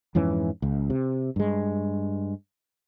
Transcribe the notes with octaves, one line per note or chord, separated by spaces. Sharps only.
F2 G#2 E3 C#4
C#2
C3
G2 G#3